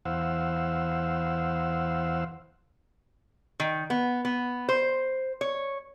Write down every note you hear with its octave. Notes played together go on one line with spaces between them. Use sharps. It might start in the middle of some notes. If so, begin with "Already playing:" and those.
E2 C5 F5 F#5 E6
D#3
B3
B3
C5
C#5